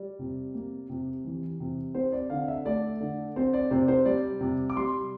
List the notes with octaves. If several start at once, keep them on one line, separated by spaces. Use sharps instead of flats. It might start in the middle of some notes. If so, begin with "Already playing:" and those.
Already playing: G3 D5
C3
A#3
C3
E3
C3
C4 C5
D5
D3 F5
E5
A3 D5
D3
C4 C5
D5
C3 C5
C5
G3 D5
C3
D6
G3 C6